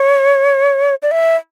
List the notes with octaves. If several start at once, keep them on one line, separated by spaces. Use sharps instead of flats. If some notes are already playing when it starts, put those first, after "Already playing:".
Already playing: C#5
D5
E5